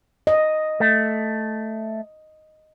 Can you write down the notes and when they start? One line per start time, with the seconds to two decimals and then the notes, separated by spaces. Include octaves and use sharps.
0.27 D#5
0.80 A3